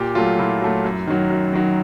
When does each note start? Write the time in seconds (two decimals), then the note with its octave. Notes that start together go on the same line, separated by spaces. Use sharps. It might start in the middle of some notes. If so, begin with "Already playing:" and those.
Already playing: A#2 G4
0.15 F#3 A3 F4
0.39 A#2 E4
0.61 F#3 A3
0.84 F#2
1.07 D#3 F#3
1.30 F#2
1.53 D#3 F#3